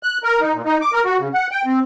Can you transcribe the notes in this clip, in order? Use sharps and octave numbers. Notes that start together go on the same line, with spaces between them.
F#6
A#4
D#4
A#2
D#4
D6
A#4
F#4
C#3
F#5
G5
C4